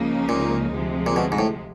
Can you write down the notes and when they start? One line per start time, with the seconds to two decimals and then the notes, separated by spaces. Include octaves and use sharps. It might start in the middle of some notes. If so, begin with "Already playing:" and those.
Already playing: C#2 C#3 F3 A#3 D#4
0.29 A#2
0.73 D2 C3 F3 G#3
1.06 A#2
1.16 B2
1.32 G#2
1.39 A2